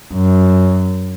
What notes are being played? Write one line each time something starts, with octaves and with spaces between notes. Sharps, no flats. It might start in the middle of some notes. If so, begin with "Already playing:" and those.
F#2